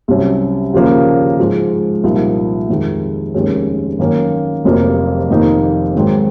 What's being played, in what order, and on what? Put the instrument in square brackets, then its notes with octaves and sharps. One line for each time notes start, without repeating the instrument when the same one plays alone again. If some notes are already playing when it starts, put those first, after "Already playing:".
[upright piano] C2 C3 F#3 C#4
D#2 C#3 F3 A#3 F4
G#2 F3 G#3
C2 A#2 F3 A#3 D#4
F2 D#3 G#3
F1 D#2 D#3 G#3 C#4
F#2 D#3 A#3 C#4
F1 F2 C3 F#3 A#3
F1 F2 D#3 A#3 D#4
G#2 D#3 F#3 C4